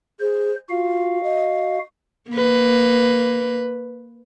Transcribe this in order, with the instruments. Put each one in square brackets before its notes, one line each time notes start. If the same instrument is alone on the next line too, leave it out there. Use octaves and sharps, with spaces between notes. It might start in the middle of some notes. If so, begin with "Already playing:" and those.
[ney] G#4 [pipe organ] C5
[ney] F4 [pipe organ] F#4 F5
[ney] D#5
[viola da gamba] A#3 B4